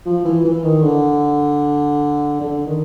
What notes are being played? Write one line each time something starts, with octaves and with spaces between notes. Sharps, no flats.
F3
E3
E3
D#3
D3
D3
D#3